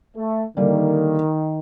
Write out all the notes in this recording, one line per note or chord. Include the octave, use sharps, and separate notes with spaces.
A3
D3 D#3 G3 A#3